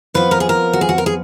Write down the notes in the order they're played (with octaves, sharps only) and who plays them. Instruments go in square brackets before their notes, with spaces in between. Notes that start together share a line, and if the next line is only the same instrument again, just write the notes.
[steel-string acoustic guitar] F2 F3 B3 B4
A#4
G#4
A#4
F#4
G#4
F#4
A#4
G#4